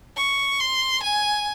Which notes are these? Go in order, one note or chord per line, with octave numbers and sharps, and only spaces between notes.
C#6
C6
G#5